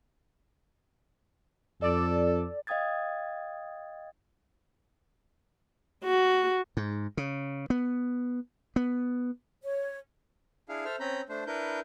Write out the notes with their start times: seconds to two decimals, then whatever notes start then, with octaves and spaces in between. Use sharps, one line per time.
1.82 F2 A4 D5
2.67 D#5 F5 G5 D#6 G#6 A6
6.04 F#4
6.77 G#2
7.17 C#3
7.70 B3
8.76 B3
9.63 C#5
10.69 D4 E4 G#4 F5
10.85 A4 C5 E5 F6
11.00 C4 C#4 A#5 B5 G6
11.29 A3 D4 C5
11.47 D4 E4 A#4 B4 G6